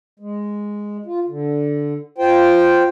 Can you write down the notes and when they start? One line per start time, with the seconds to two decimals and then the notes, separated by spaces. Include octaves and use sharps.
0.20 G#3
1.06 F4
1.28 D3
2.18 F4 C5 G5